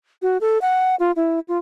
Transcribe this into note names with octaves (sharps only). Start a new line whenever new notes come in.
F#4
A4
F#5
F4
E4
F4